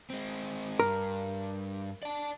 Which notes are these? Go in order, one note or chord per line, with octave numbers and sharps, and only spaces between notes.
G#3 C4
G2 A#4
D5 A5